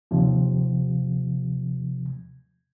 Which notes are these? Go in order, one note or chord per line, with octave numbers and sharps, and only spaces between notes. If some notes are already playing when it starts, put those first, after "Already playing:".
D#2 C3 F3